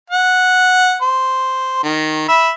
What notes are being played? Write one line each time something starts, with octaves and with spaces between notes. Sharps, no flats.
F#5
C5
D#3
E5 B5